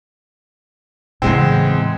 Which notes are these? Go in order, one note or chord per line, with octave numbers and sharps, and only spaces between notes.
E2 A2 C#3 G#3 C4